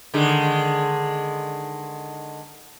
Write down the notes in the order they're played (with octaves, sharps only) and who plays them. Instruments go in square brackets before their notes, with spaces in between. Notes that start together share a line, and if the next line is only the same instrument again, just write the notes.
[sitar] D3 D#3 G#3